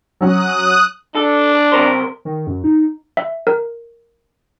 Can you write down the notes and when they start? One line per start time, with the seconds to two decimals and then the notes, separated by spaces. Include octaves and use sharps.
0.21 F#3 C#4 D#6 F#6
1.15 D4 A4
1.72 C3 A#4 C5
2.25 D#3
2.47 F#2
2.64 D#4
3.17 E5
3.47 A#4